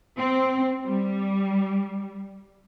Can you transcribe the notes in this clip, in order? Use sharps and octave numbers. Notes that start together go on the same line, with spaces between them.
C4
G3